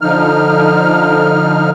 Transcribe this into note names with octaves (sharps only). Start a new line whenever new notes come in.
D3 F3 D#4 F6